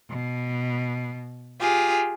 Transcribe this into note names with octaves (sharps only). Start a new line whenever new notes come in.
B2
F4 G4 G#4